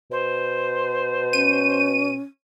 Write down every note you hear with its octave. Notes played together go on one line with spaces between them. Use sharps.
B2 C5
C#4 D#7